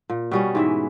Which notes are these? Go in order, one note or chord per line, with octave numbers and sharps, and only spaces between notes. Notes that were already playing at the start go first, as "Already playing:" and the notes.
A#2
B2 G3 C#4
G#2 E3 E5